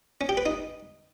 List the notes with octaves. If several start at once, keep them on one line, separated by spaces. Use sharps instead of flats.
C#4
G4
B4
D#4